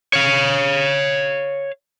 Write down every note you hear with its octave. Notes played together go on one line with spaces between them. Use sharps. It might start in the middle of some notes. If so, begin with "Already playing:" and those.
C#5 F5